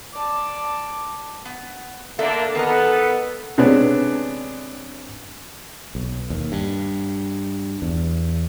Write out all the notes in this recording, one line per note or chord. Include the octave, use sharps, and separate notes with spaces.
D5 A5
B3
D3 A#3 B3 D4 A4 E5
D#3 B3 A4 A#4 D#5
C3 G#3 B3 C#4 D4
B1
D#2
G2
E2